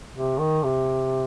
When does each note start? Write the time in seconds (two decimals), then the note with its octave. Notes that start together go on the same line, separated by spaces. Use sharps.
0.14 C3
0.39 D#3
0.64 C3